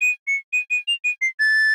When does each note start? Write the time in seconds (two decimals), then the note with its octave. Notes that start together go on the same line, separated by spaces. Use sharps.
0.01 D#7
0.27 C#7
0.53 D#7
0.71 D#7
0.88 F7
1.04 D#7
1.22 C7
1.40 A6